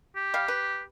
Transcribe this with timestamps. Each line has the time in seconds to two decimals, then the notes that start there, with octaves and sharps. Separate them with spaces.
0.16 G4
0.34 G3 F5
0.48 B4